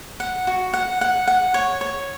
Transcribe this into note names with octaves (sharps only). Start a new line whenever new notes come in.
F#5
F#4
F#5
F#5
F#5
C#5
C#5